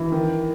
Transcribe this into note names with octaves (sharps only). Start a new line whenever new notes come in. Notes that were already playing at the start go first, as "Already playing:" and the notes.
Already playing: E3
D#3